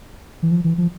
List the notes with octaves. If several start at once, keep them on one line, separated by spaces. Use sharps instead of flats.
E3
F3
E3
F3